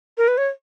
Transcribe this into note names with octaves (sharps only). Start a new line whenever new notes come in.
A#4
B4
C#5